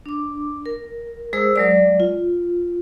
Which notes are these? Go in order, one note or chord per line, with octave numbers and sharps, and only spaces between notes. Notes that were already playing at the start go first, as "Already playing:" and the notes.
D4 D6
A#4
G#3 G#4 A#4 C5 D#6 E6
F#3 G#3 D5
F4